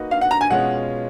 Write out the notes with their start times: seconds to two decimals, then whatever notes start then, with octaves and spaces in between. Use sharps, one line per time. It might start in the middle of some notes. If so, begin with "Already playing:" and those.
Already playing: A#3 D#4 F#4 B4 D#5
0.11 F5
0.21 F#5
0.31 A#5
0.41 G#5
0.50 B2 G#3 C#4 F4 F#5